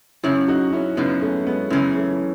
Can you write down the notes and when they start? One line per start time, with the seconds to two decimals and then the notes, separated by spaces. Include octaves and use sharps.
0.23 F#2 C#3 C#4 E4
0.48 D#4 F#4
0.73 C#4 E4
0.97 F#2 C#3 B3 D#4
1.22 A3 C#4
1.46 G#3 B3
1.70 F#2 C#3 E3 C#4 E4
1.95 A3 C#4
2.11 E4